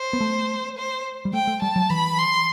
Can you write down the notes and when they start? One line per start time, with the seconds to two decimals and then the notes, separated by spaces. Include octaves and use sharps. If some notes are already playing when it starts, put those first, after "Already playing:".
Already playing: C5
0.13 B3
0.21 A3
0.77 C5
1.25 G3
1.33 A3 G5
1.47 A3
1.62 G3 A5
1.76 F#3
1.90 E3 B5
2.19 C6